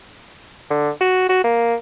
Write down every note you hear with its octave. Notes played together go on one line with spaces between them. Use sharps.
D3
F#4
F#4
A#3